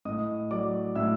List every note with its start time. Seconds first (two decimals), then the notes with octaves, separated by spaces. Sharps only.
0.05 A2 D#5 D#6
0.50 F#3 D5 D6
0.95 A2 E5 E6